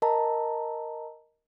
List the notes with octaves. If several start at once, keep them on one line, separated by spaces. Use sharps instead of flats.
A#4 D#5 A5 A#5